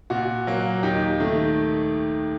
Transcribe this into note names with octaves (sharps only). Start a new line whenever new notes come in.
A#2 F#4
F#3 A#3
D#2 D#4 G4
D#3 A3